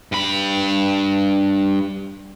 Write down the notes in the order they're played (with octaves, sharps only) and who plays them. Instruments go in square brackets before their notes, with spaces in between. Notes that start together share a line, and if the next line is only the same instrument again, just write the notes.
[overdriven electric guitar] G2 B5